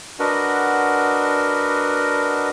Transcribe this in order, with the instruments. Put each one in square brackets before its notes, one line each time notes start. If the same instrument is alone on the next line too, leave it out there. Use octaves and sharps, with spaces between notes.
[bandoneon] D4 F#4 A#4 B4 D#5 F#5